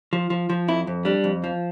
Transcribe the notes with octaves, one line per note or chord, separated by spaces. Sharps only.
F3
F3
F3
F2 E4
F2
G3 D4
F2
F3